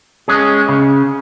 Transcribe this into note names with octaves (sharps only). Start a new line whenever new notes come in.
G#3 C#4 G#4
C#3